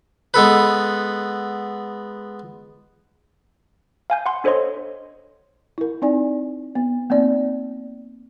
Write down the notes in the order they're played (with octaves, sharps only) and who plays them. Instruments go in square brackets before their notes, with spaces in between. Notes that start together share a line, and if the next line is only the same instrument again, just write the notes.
[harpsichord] G#3 B3 A4 B4
[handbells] F5 G#5 G6
F#5 C6
D4 A4 C5 C#5 D#5 C6
[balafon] E4 A#4
C4 D#4 D5 G#5
B3
A#3 C4 D#4 D5